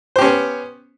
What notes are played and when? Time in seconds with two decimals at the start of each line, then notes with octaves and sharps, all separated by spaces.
0.16 C5
0.19 G4
0.21 C#4
0.24 B3